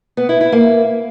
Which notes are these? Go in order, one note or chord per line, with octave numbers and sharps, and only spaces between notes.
B3
E4
E4
A#3